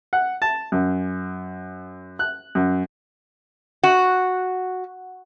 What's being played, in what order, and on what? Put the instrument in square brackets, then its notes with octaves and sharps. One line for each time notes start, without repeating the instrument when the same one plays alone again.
[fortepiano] F#5
A5
F#2
F#6
F#2
[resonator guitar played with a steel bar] F#4